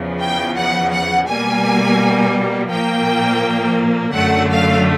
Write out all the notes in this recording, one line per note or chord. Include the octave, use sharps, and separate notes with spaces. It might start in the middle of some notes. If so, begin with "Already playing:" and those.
Already playing: E2 C#3 F3
G5
F#5
F#5
B2 G3 A#3 G#5
A#2 F3 A#3 G5
F#2 D3 F#3 A3 F#5
F5